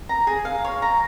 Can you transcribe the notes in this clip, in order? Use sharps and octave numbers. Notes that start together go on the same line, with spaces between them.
A#5
G#4
F5
C#5
A#5